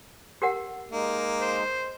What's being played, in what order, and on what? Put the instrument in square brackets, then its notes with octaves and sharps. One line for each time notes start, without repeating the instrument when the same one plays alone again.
[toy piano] G4 A#4 F#5
[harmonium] G#3 D#4 [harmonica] A#3
[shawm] C5